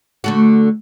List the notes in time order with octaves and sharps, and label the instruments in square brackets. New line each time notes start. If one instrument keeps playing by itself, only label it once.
[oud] D3 A3 F#4